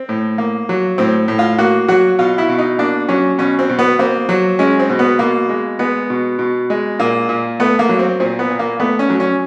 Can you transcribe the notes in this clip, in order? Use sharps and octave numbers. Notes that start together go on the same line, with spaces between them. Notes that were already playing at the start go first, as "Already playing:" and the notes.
Already playing: C4
A2
A#3
F#3
A2 C4
A2
F4
A#3 F#4
F#3 F#4
B2 F4
E4
B2
D#4
A#3 D4
F#3 C#4
B2 C#4
C4
B2
B3
A#3 C4
F#3
G#3 C#4
C4
B2
B3
B2 A#3
G#3
G#3 B3
B2
B2
G#3
A#2 A#3
A#2
A3 B3
A#3
F#3
C4
A#2 C4
B3
A#2
A#3
A3 B3
C#4
F#3
C#4